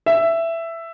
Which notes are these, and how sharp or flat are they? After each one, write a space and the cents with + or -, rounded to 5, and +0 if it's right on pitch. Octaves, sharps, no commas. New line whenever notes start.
E5 +10